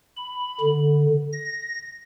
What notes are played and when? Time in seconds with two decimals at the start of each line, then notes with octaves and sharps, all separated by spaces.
0.16 B5
0.61 D3
1.33 A#6